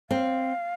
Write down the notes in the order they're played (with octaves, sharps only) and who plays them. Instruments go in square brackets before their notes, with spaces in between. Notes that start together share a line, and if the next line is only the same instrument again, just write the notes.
[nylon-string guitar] C4 [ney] F5